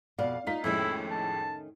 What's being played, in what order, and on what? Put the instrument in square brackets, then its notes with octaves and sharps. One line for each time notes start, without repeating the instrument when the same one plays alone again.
[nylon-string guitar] F2 B2 D5 [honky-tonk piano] F5
[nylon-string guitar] A#3 D#4 [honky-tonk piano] F4 B6
[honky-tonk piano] F2 A2 G#3 [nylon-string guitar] D#3 A3 C#4 [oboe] E4
[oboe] A5